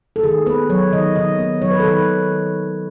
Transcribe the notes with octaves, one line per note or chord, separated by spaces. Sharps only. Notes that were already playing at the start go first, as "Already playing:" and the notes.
A4
D#3 G#4
B3 B4
F#3 C#5
D#3 D#5
D#3 D#5
B3
F#3 C#5
B4
A4
D#3 B4